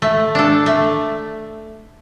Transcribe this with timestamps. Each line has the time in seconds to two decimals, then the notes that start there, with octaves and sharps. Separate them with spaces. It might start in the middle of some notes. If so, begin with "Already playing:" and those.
0.02 A3
0.35 D4 A4
0.66 A3